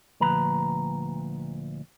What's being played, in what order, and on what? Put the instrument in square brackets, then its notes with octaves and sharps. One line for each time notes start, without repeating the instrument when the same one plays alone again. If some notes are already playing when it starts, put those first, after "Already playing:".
[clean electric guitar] D2 A#2 F3 B4 A#5 B5